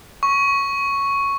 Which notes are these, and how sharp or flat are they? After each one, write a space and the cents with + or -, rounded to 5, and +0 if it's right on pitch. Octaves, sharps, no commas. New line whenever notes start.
C#6 +0